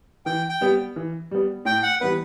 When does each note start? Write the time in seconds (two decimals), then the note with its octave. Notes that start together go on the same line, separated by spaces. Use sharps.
0.26 E3 G5
0.49 G5
0.61 G3 B3
0.96 E3
1.31 G3 B3
1.65 A2 G5
1.83 F#5
2.01 E3 G3 B3 B4